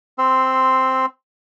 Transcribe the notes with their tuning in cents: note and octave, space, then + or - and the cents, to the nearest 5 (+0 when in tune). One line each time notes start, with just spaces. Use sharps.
C4 +0 C6 -5 E6 +0